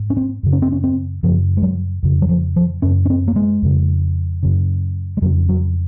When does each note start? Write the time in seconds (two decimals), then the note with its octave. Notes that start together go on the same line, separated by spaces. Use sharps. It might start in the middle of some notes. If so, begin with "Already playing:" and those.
Already playing: G#2
0.10 C#4
0.17 C4
0.43 F#2 C#3
0.52 C#4
0.62 C4
0.72 C#4
0.84 C4
1.23 F#2 C#3 F3
1.57 G#3
1.63 F#3
2.03 F2 C#3
2.22 F#3
2.29 F3
2.56 F3
2.82 F#2 C#3 C#4
3.06 C#4
3.10 C4
3.28 A#3
3.36 G#3
3.62 F2 C#3
4.43 F#2 C#3
5.17 G#3
5.22 F2 C#3 F#3
5.49 F#3